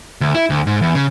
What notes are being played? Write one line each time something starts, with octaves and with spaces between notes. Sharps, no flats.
D2
E4
D2
G#2
E2
C#3